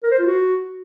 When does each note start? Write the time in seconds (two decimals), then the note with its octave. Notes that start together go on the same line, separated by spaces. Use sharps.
0.03 A#4
0.11 C5
0.19 F4
0.27 F#4